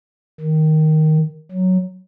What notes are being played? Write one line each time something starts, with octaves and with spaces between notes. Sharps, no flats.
D#3
F#3